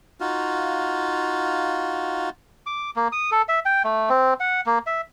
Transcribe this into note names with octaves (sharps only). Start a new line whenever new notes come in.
D#4 F4 F#4 F5
D6
A#3
D#6
A4
E5
G5
A3
C4
F#5
A#3
E5